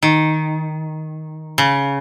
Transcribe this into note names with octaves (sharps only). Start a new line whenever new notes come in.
D#3
C#3